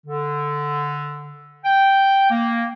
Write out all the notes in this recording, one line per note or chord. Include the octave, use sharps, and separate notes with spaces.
D3
G5
A#3